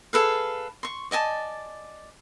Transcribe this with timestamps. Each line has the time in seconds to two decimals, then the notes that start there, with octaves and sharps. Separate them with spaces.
0.13 G#4 A4 B4 F5
0.83 C6 C#6
1.11 D5 D#5 G#5 A5